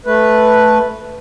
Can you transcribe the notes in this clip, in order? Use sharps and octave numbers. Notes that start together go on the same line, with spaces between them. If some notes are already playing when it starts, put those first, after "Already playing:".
A3 B4